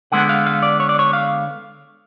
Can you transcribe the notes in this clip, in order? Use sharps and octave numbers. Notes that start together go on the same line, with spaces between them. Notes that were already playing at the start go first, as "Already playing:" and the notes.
D3 G#3 B3 F#5
F5
F5
D5
C#5
D5
C#5
F5